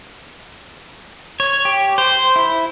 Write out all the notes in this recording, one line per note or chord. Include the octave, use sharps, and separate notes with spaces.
C#5
G4
C5
E4